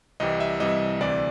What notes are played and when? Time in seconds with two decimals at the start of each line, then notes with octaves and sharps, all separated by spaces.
0.20 C2 C3 E3 G3 D#5
0.40 E5
0.60 C2 C3 E3 G3 D#5
1.00 D2 C3 E3 D5